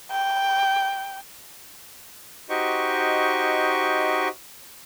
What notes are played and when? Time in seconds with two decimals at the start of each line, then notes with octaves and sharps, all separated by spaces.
0.10 G5
2.50 D#4 F#4 G4 C5 D#5 C#6